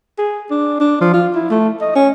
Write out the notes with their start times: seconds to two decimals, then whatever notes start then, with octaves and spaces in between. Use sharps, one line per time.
0.18 G#4
0.50 D4
0.80 D4
1.01 F3
1.13 F4
1.35 E4
1.50 A3
1.81 D#5
1.95 C#4